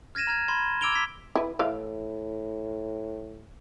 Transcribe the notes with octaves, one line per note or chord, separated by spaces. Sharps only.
F6 G#6 A#6 D#7 E7
A#5 F6 G#6
B5 C6 G#6
D6 E6 G#6 D7 F7 G7
G#6 B6
E4 B4
A2 E3 E4 F5